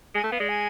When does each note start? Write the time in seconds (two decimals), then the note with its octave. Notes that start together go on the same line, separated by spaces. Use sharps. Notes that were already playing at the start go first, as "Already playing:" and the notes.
0.15 G#3 G#5
0.24 A3 A5
0.32 B3 F5
0.40 G#3 D5
0.49 G#5